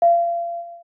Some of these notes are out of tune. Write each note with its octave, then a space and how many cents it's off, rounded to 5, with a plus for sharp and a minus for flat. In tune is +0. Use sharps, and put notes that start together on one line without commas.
F5 -35